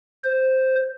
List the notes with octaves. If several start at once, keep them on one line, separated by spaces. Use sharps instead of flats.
C5